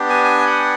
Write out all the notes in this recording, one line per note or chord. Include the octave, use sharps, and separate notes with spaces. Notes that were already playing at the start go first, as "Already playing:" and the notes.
Already playing: B3 D4 G4
G#5
G#5
F#5